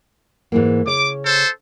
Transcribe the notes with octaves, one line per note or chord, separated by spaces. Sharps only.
G#2 E3 A#3
C#3 C#5 D6
A4 C5